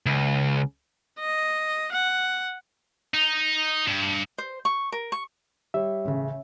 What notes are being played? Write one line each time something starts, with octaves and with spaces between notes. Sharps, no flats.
C#2
D#5
F#5
D#4
G2
C5
C#6
A#4
C#6
G3 C#5 E5
A1 C#3